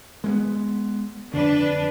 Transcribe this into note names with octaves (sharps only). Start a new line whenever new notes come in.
G#3 A3 B3
F2 D3 D4 B4 D5